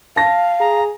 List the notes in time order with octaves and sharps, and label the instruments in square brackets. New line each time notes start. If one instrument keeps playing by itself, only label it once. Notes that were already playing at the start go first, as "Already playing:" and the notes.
[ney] F5 [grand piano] A5 A#6
[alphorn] G#4 [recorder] A#5